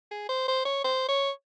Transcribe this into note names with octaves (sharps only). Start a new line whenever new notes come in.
G#4
C5
C5
C#5
C5
C#5